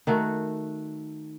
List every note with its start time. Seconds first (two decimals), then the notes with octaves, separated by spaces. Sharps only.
0.07 D#3 A3 F#4